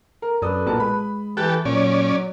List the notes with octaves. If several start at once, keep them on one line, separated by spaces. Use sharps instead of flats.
A#4
F#2 A4 B4 D5 D#6
B1 A#2 A5
G#3 B5
E3 G4 A4 F#6
A#2 F#3 C#4 D5